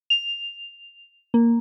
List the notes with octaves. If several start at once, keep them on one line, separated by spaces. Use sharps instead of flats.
F7
A#3